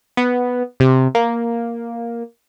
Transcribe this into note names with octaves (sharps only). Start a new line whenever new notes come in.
B3
C3
A#3